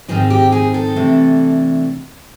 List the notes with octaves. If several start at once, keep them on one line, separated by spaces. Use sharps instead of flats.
G#2 D#3 G#3 C4 D#4 G#4
G4
G#4
A4
C3 E3 A3 D4